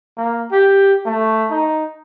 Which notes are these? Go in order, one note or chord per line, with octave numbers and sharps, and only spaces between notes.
A#3
G4
A3
D#4